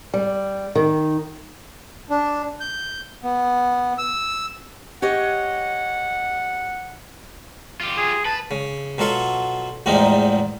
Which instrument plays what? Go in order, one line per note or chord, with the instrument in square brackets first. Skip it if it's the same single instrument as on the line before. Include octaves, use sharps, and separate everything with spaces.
[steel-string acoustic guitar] G3
D#3
[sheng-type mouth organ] D4
G6
B3
E6
[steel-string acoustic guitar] G4 C#5 D#5 [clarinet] F#5
[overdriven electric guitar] F4 G4
[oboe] G#4
[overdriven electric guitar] B4 [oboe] A5
[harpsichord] C#3
B2 F#3 F4 A4
A1 E2 G#2 F3 G3 D#4